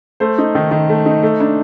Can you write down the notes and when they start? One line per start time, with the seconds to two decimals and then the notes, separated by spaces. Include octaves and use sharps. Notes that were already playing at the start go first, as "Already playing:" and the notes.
0.20 A3 C5
0.38 D#4
0.55 D#3
0.71 D#3
0.89 A3
1.06 D#4
1.23 A3
1.40 D4